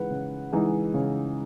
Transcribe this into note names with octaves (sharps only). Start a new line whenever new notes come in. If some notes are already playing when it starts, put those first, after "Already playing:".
Already playing: C#3 E3 G#3 D#4 B4 F#5
C#3
E3 G#3 D#4
C#3